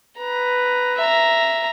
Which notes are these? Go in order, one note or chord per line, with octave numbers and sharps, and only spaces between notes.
B4 A#5
E5 A#5